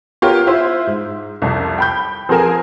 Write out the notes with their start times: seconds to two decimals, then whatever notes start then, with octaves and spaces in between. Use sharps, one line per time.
0.22 B3 F4 G4 A#4 C#5 G5
0.47 E4 F4 C5 E5
0.87 G#2
1.42 C2 F2
1.78 G5 B5 G6
2.29 F3 C4 G#4 A#4 G#5 E7